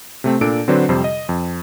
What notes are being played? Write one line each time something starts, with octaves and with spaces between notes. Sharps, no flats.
C3 A3 C4
A#2 D4 A4 D7
D3 F#3 C4 D4 B4 C5
F2 C3 G3 C5
D#5
F2